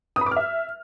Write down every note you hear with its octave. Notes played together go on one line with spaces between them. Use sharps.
D#6
B5
D6
F6
E5